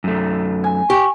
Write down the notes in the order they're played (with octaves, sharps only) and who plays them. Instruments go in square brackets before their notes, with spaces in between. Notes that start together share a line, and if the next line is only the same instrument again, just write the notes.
[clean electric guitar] F#2 A3
[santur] G#5
[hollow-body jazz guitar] G4 [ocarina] C#6